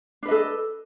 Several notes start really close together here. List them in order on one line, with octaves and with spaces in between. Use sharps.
D4 B4 D#5 A4